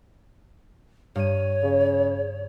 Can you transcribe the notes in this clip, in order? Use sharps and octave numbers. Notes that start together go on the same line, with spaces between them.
G2 C#5 D#7
C#3